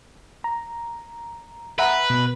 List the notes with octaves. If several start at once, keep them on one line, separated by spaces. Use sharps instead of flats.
A#5
B4 E5 F#5 A#5
B2